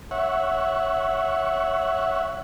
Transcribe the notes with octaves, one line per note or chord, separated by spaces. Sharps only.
C#5 E5 F#5